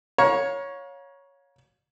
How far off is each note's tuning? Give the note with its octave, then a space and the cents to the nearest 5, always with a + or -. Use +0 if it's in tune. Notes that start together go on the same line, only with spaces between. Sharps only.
C#5 +0 F5 +35 A#5 +35